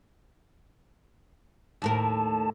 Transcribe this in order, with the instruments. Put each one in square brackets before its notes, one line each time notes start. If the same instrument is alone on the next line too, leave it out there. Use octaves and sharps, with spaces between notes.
[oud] D#2 A2 A#4 [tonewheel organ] A5